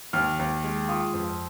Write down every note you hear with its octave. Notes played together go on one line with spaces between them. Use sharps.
D#2 F6
D#2
G#3
F4 D#6
F2